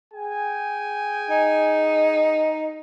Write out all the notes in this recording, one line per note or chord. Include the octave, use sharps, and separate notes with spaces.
G#4 G5 G#5
D#4